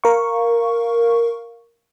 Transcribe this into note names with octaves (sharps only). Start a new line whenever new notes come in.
A#4 F5 C#6